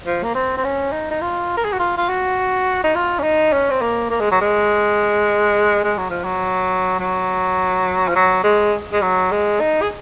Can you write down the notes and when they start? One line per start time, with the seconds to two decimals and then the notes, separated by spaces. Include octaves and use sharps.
0.06 F3
0.24 A#3
0.35 C4
0.57 C4
0.64 C#4
0.93 D#4
1.11 D#4
1.21 F4
1.57 A#4
1.65 G#4
1.73 F#4
1.79 F4
1.97 F4
2.09 F#4
2.84 D#4
2.95 F4
3.19 C#4
3.23 D#4
3.53 C#4
3.70 C4
3.81 A#3
4.10 A#3
4.20 G#3
4.31 F#3
4.41 G#3
5.84 G#3
5.98 F#3
6.10 F3
6.24 F#3
7.00 F#3
8.08 F3
8.16 F#3
8.44 G#3
8.93 G#3
9.02 F#3
9.31 G#3
9.60 D#4
9.82 G#4